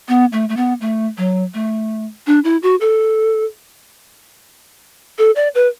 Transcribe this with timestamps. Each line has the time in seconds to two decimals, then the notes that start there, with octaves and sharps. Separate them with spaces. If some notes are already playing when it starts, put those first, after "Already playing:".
0.08 B3
0.32 A3
0.49 A3
0.57 B3
0.81 A3
1.17 F#3
1.54 A3
2.27 D4
2.44 E4
2.63 F#4
2.81 A4
5.18 A4
5.36 D5
5.55 B4